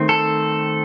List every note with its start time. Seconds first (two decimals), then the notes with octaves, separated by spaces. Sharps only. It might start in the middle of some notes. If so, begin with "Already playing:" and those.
Already playing: D#3 A3 C4
0.09 A4